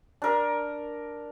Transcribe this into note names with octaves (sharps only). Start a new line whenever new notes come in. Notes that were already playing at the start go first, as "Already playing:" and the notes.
D4 A#4